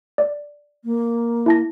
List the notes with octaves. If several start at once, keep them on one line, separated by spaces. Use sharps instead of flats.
D5
A#3
E4 A5 A#6